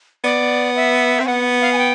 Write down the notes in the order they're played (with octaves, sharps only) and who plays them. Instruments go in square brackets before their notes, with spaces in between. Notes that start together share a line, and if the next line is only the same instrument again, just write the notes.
[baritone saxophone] B3 [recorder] D5
[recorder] E5
[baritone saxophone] C4
[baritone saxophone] B3 [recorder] F#5
[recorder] F5
G#5
G5